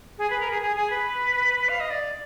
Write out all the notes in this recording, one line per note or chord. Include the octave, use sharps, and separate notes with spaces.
G#4
B4
A#4
G#4
G#4
G#4
B4
F5
D#5
D5